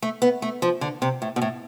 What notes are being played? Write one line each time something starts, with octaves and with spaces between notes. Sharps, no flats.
A3
B3
A3
F3
D3
C3
A2
B2
A2